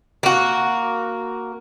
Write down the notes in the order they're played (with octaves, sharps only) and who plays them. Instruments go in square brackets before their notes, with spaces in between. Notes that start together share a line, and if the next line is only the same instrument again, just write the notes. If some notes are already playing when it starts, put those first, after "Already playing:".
[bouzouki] A#3 F#4